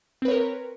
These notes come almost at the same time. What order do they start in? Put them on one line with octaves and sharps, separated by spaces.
C4 B4 C#5 A#4